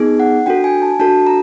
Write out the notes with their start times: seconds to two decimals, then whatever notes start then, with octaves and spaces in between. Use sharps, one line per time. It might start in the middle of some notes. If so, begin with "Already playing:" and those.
Already playing: B3 D#4 G#4
0.20 F#5
0.46 D4 F#4 A4 G5
0.64 G#5
0.82 A5
1.00 D4 F#4 A4 A5
1.27 A#5